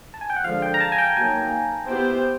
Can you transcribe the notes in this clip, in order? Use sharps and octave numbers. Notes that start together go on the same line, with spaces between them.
A5
G#5
G5
F#5
D3 F3 G#3 F5
G5
A#5
A5
G#5
G5
F#3 A#3 D#4 G#5
B3 E4 G4 C5 G5
G5